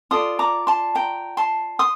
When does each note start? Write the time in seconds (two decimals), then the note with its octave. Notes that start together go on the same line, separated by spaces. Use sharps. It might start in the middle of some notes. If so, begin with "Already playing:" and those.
0.11 F4 A4 D5 C6 D#6
0.39 A#5 D6
0.67 A5 C6
0.95 G5 A#5
1.37 A5 C6
1.79 C6 D#6